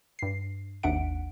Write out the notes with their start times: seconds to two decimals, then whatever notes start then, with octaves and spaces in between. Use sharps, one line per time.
0.19 G2 C7
0.83 G#1 D#2 D4 E5 F#5 D7